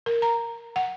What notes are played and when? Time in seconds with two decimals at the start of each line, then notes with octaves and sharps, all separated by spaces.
0.06 A#4
0.22 A#5
0.76 F#5